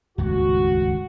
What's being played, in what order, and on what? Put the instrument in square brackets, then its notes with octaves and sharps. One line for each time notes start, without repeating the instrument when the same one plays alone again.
[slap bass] D#1 C#2 G2 [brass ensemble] F#4